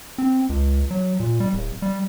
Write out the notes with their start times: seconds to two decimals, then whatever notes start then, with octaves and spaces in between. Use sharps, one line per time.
0.18 C4
0.49 C#2
0.91 F#3
1.20 A#2
1.40 G3
1.53 D1
1.82 G3